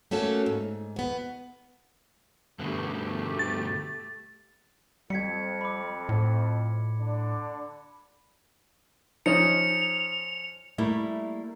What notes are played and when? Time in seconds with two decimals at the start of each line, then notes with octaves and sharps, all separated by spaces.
0.11 A3 A#3 C#4 F#4 A4
0.46 G#2
0.96 B2 B3
2.59 G2 B2 D3 A3 G4
3.39 A6
5.10 F2 G3 G#6 B6 C#7
5.61 B5 D6
6.09 A2
7.00 D3 D4
9.26 F3 C#4 D#4 C#7 F7
10.78 G3 A3 A#3 E4